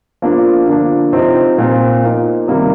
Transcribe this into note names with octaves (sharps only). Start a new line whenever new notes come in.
F3 A#3 D4 F4
D3 F3 A#3 D4
C3 F3 C4 D#4
A#2 F3 C4 F4
F3 A#3 D#4
C3 D#3 G3 A#3